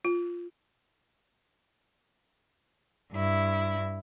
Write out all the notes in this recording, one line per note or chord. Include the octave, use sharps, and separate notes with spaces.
F4
G2 E4